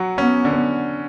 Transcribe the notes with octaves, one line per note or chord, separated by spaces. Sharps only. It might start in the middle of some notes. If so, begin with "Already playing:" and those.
Already playing: F#3 F#4
B3 C#4
D3